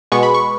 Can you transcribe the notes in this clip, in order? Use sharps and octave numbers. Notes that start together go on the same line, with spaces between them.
B2 G#3 B3 C#6
B5
C#6